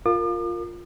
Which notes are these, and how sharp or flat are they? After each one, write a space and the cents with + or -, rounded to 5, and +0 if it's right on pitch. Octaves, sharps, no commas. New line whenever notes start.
F4 +5 A#4 -15 D6 +45